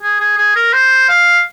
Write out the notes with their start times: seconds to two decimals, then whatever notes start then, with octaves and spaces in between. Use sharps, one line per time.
0.03 G#4
0.20 G#4
0.38 G#4
0.56 A#4
0.73 C5
1.09 F5